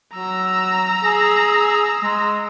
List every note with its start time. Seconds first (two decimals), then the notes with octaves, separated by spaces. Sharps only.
0.15 F#3 A#5 E6
1.04 G#4
2.03 G#3